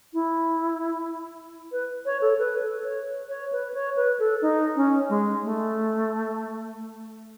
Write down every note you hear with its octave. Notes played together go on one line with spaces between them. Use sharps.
E4
B4
C#5
A4
B4
A4
C#5
C#5
B4
C#5
B4
A4
D#4
C#4
G#3
A3